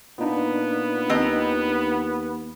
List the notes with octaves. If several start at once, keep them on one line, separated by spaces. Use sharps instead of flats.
A#2 B3 D4 D#4 F4
D#2 C4 D#5 A#5